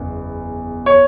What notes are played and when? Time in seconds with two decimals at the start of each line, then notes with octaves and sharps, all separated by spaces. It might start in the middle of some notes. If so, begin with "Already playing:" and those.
Already playing: F#1 E2
0.86 C#5